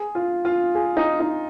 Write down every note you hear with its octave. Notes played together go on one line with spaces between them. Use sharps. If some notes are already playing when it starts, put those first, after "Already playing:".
Already playing: G#4
F4
F4
G#4
D#4
D#4